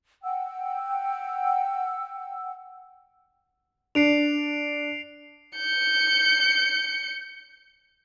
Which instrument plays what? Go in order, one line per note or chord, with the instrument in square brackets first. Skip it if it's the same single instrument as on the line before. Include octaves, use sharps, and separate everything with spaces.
[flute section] F#5 G5 E6
[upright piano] D4 [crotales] C7 D7 F7
[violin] G6 C#7